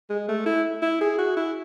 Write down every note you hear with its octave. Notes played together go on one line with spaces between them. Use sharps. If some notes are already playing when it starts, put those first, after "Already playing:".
G#3
A3
E4
E4
G#4
F#4
E4